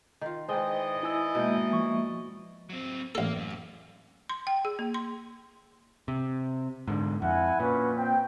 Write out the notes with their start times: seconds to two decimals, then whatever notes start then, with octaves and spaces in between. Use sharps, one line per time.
0.21 D#3 F4
0.48 D#3 E3 G#3 C5 D5 D#5 G5
1.03 E4 G#5 E6
1.35 B2 G#3 A#3 E5 G5
1.73 F3 C#6
2.70 F#3 C4
3.15 A1 A#3 A4
3.36 F#2
4.29 C6
4.47 G5
4.65 G#4
4.79 A#3
4.94 C6
6.08 C3
6.88 G#2 D3
7.22 F2 E4 F#5 G#5
7.60 A#2 C#4 B4
7.97 C4 G5